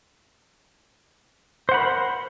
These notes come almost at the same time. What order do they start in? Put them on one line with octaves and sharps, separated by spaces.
C5 F#5 B5 A#4